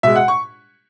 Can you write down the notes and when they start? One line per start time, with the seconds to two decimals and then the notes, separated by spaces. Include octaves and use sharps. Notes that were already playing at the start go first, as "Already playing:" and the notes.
0.03 B2 G#3 E5
0.16 F#5
0.28 C#6